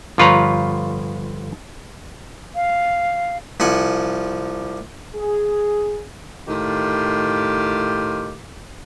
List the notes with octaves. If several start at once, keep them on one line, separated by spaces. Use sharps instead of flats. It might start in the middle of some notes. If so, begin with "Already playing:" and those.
G1 F3 F4 B4 C#5 A#5
F5
C2 F3 F#5 G#5
G#4
A2 D#3 F4 G4